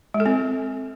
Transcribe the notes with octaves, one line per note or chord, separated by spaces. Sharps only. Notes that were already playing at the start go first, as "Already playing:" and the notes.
G#3
A4
C4